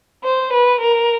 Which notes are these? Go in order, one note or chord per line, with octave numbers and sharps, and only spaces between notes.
C5
B4
A#4